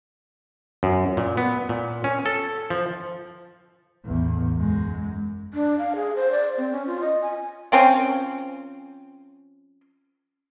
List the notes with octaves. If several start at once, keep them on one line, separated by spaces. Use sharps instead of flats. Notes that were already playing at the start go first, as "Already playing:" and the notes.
F#2
A#2
B3
A#2
C#4
A4
F3
A1 E2
F#2 G#3
D4
F5
G#4
C5
D5
C4
C#4
F4
D#5
G#5
F3 C4 C#4